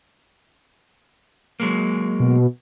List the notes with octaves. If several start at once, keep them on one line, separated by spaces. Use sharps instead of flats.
F#3 G#3 A#3
B2